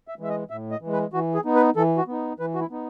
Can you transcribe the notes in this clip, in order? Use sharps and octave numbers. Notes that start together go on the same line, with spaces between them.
E5
E3 G#3 E5
D#5
A2 E5
D#5
E3
G#3
B4
E3 F#4
G#4
B3 D#4
B4
E3 A4
F#4
B3 D#4
E3 B4
F#4
E4
B3 D#4